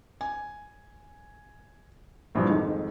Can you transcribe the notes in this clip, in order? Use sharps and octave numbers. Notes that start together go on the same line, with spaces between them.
G#5
A#1 G2 E3 F3 G3
F2 G#2 D#3